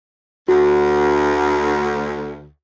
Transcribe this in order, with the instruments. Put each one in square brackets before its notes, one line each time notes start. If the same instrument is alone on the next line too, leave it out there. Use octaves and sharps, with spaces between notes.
[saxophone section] D2 [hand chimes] F#4